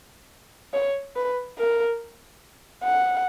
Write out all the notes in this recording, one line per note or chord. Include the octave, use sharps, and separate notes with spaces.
C#5
B4
A#4
F#5